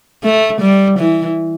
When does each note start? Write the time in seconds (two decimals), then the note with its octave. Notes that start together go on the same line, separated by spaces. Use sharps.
0.24 A3
0.61 G3
0.99 E3